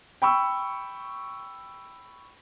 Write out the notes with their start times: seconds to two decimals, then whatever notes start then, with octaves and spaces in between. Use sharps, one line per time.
0.22 G5 B5 C#6 E6